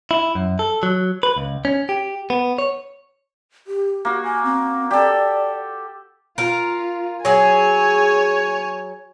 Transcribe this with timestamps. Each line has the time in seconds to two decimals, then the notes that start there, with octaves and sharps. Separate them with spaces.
0.11 E4
0.35 F#2
0.59 A4
0.83 F#3
1.23 B4
1.36 C#2
1.65 C#4
1.89 G4
2.30 B3
2.58 C#5
3.67 G4
4.05 A#3 F#4
4.24 G#5
4.44 C4
4.91 G4 A4 D5
6.38 F4 A#4 F5
7.25 F#3 G#4 C#5 G#5